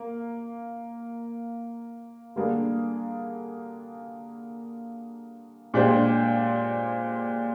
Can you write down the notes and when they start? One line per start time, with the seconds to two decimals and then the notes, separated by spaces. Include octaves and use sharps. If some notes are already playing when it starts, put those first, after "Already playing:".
Already playing: A#3
2.36 D3 G3 A#3 D4 G#4
5.74 A#2 G#3 D4 G4 C5